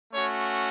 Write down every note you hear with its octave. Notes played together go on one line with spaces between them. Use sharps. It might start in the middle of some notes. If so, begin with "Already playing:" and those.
A3 C#4 F#4 C#5